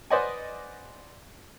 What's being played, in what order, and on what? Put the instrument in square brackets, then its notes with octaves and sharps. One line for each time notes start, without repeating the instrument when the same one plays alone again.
[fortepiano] B4 C5 D5 D#5 F#5 G#5